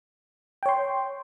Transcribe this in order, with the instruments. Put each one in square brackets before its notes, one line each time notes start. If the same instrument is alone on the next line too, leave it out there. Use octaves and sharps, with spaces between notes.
[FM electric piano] G5
C#5
C6